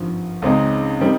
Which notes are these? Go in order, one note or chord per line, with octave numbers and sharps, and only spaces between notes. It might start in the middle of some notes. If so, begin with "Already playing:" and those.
Already playing: G#1 G2 F3
C#2 C#3 G#3 C4 D#4
D#3 G3 C4 D#4